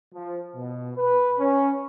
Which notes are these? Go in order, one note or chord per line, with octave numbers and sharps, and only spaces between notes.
F3
B2
B4
C#4